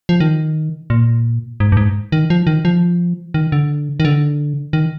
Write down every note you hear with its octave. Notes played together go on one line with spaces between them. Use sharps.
F3
D#3
A#2
G#2
G2
G#2
D#3
F3
D#3
F3
D#3
D3
D#3
D3
D#3